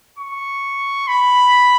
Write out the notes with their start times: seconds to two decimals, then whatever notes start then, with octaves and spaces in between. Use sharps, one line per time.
0.18 C#6
1.08 B5